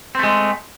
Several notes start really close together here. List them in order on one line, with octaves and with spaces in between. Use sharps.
C4 A3 G#3